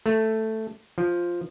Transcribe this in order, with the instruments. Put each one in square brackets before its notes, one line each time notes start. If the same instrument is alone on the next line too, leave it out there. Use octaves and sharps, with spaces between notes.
[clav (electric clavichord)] A3
F3